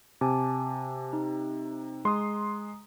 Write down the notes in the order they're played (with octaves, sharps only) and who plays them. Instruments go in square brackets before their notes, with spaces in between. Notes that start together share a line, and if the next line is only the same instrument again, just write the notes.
[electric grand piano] C3 [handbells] G#5 A5 D6
[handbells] D#4
[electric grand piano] G#3 C6 [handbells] A#5 D#6